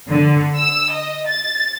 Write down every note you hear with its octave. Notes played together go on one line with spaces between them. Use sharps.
D3
E6
D#5
A6